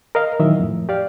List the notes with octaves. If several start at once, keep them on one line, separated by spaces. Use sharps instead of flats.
A#4 D#5 F5
A#2 D#3 E3 F#3 D#5 E5
F2 A2
G4 D5 F5